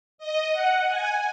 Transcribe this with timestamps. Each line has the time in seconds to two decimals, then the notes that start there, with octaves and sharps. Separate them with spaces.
0.18 D#5
0.52 F#5
0.86 G#5